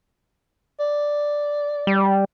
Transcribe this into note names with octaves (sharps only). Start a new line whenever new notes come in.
D5
G3